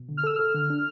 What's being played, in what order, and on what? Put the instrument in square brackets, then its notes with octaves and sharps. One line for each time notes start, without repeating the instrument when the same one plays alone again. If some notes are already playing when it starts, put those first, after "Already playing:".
Already playing: [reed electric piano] B2
D3
[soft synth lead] F6
[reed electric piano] A4 [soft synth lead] E6
[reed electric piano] A4 [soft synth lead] F6
[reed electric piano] D3
D4